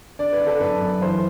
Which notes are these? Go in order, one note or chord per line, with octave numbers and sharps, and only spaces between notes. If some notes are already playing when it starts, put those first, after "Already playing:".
D3 D5
B4
D3
A4
F#2 B4
F#2
E3 C5